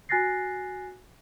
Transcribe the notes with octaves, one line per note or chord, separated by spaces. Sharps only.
F#4 G#5 F#6 A6 A#6 C7